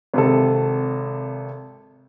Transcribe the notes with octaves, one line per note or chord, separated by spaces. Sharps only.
G#1 C3 A4